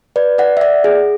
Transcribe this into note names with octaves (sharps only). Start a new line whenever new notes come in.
B4 D5
D5 F#5
E5
D5 F#5
G#4